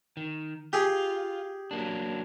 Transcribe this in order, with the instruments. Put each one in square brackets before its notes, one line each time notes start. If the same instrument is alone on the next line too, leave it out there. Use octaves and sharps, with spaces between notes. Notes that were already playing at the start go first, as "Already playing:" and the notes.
[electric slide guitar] D#3
[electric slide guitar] F4 [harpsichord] G4 G#4
[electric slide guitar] F#3 A#3 D4